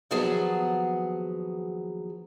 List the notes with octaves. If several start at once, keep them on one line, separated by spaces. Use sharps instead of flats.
D#2 F3 F#3 B3 G#4 A5